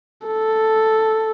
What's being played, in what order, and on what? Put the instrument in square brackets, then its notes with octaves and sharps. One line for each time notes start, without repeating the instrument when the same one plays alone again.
[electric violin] A4